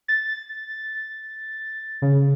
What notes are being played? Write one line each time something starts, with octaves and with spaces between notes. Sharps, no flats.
A6
C#3